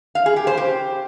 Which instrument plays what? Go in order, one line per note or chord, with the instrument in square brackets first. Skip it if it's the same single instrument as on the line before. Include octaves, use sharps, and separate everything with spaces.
[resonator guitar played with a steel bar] F5
G#4
G4
C5
G4